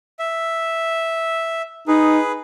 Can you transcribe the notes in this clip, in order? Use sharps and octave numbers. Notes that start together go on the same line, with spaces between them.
E5
D#4 G#4 B4